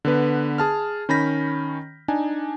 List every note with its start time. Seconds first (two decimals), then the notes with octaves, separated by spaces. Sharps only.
0.05 D3 B3 B4
0.58 G#4 A5 F6
1.09 D#3 C#4 B5 G6 A#6 B6
2.08 D4 D#4 G#5